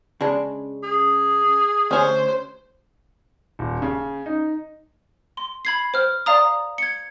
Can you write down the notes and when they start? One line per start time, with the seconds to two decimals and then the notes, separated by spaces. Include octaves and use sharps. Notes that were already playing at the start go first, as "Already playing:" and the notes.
0.21 C#3 G#3 D4
0.83 G#4
1.91 D2 C#4 C5 C#5 G#5
3.59 D#1
3.82 C#3
4.26 D#4
5.37 C6
5.65 B5 G#6 C7
5.94 C5 F6
6.26 D5 F5 A#5 D#6
6.78 G#6 C#7